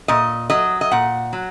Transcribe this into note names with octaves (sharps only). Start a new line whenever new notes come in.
A#2 D#5
F#3 D#5
D#5
A#2 F#5
F#3